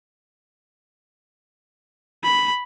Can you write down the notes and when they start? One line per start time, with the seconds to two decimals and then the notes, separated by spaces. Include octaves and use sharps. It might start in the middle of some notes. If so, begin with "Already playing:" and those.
2.24 B5